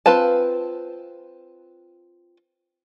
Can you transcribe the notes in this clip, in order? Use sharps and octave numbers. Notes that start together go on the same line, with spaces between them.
C4 F4 B4 F5 A5